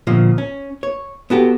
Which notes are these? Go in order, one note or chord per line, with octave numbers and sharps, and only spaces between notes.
D2 A#2 F3
C#4
C#5
B3 F#4 G4 A4